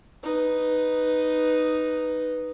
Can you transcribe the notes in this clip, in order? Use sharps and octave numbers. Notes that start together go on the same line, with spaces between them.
D#4 B4